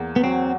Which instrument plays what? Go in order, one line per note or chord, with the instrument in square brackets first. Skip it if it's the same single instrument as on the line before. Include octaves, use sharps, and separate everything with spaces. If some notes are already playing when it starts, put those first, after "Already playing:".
Already playing: [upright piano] E2 A#3
[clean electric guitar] B3
[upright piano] F#3 [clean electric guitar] C4